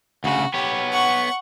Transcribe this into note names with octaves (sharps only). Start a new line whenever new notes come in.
D2 C#3 F#4
B3 G4 C#5
F#5 C#6